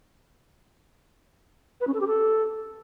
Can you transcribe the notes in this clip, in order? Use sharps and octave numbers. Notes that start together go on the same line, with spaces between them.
B4
C#4
A4
G4
A4